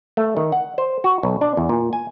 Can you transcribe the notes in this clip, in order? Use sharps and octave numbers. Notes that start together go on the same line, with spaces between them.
A3
D#3
F#5
C5
F#4
B1
D4
E2
A#2
G#5